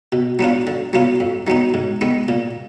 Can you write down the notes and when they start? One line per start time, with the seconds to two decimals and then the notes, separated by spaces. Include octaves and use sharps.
0.12 B2
0.39 F#3 B3 D4 F4
0.67 D3
0.93 F#3 B3 F4
1.20 F2
1.47 D#3 F#3 B3 D#4
1.74 G#2
2.01 D#3 G#3 B3
2.28 A#2